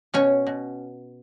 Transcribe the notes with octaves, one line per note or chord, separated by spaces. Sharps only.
B2 C#4 C#5
B2